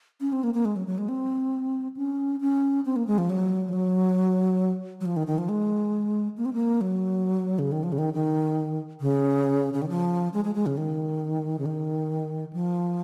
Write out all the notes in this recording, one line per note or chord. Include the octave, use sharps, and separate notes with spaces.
C#4
C4
A#3
A#3
G#3
F#3
F#3
G#3
C4
C#4
C#4
C4
A#3
G#3
F3
F#3
F3
F#3
F#3
F3
D#3
D#3
F3
G#3
A#3
C4
A#3
F#3
C#3
D#3
F3
C#3
D#3
D#3
C#3
C#3
D#3
F3
G#3
G#3
G#3
C#3
D#3
C#3
D#3
F3